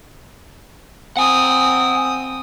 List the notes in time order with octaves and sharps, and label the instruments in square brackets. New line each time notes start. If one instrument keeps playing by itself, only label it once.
[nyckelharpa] C4 D#6 [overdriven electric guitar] F#5 G#5